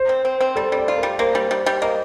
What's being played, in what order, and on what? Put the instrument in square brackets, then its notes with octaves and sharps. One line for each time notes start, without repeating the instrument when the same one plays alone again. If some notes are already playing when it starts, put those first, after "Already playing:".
Already playing: [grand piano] C5
[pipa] C4
C4
C4
[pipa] G3 [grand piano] A4
[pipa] G3 [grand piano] D5
[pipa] F4
[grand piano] A#4
[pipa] G3
[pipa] A#3 [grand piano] C5
[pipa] G3
G3
G3
[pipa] A#3 [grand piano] D#5